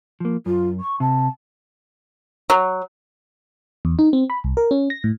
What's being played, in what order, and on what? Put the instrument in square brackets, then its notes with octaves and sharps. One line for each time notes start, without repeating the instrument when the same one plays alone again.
[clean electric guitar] F3 A#3
[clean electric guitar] F#2 [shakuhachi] F4
[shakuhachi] C#6
[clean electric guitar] C3 [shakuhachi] A5
[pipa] F#3
[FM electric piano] E2
D#4
C4
B5
C2
A#4
C#4
A#6
A2